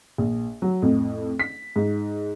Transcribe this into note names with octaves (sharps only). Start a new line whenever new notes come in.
A#1
F#3
F2 A2
B6
G#2